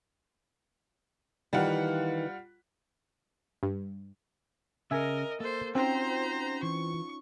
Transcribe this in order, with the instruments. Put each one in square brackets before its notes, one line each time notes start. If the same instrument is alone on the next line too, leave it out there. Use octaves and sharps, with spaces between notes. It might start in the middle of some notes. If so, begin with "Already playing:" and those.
[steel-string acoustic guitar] D#3 E3 [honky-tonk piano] G3 F4 F#5
[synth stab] G2
[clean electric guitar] C#3 [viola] A#4 D#5 [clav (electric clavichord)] E5 G#5
[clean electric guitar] A#3 [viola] A4 C5
[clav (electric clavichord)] C4 [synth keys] C#4 D#4 F4 [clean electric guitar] F#4 G5 [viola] C5 A#5
[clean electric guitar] E3 [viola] C#6